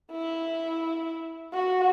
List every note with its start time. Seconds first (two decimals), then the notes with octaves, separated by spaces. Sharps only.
0.12 E4
1.53 F#4